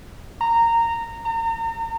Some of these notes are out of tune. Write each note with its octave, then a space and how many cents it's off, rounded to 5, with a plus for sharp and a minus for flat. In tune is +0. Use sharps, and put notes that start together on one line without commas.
A#5 -15
A#5 -40